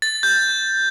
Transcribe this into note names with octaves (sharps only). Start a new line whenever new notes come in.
A6
G6